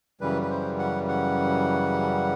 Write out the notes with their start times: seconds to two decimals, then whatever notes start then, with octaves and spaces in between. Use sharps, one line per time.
0.21 F#2 C#3 E3 G3 B4
0.42 B4
0.50 C5
0.79 F#5
1.08 F#5